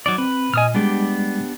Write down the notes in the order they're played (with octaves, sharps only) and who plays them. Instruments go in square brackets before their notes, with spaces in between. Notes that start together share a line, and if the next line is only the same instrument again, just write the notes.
[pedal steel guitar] F#3 D#4 D5
[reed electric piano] C4 [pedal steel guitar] B4
[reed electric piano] A#2 D#5 [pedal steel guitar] G#5 D#6 F6
[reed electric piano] G3 G#3 [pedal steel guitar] B3 D4 G4